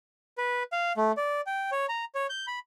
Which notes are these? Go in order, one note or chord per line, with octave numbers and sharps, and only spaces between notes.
B4
F5
A3
D5
G5
C#5
A#5
C#5
G6
B5